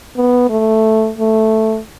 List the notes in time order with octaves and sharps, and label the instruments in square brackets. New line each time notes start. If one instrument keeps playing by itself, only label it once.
[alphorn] B3
A3
A3